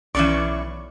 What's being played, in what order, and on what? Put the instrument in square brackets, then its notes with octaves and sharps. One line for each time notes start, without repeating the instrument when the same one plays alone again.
[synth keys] B1 C#6 [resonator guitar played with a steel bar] E3 C#4 D5